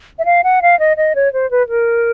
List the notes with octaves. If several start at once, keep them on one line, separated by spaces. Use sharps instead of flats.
E5
F5
F#5
F5
D#5
D#5
C#5
C5
B4
A#4